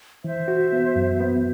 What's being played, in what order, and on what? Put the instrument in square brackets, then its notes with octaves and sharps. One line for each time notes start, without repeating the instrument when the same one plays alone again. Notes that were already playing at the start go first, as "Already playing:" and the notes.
[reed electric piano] E3 [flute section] C5 E5
[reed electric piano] F#4
B3
F#2
B3